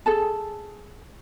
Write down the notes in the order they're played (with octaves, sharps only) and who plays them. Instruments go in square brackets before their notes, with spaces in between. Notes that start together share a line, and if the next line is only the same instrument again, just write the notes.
[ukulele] G#4 A4 A5